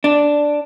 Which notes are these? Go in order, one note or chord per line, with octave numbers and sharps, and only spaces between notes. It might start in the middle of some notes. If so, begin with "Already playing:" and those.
D4